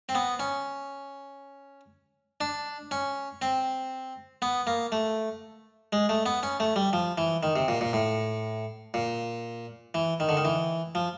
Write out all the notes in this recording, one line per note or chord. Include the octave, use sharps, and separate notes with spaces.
C4
B3
C#4
D4
C#4
C4
B3
A#3
A3
G#3
A3
B3
C#4
A3
G3
F3
E3
D#3
C3
A#2
A#2
A2
A#2
E3
D#3
D3
D#3
E3
F3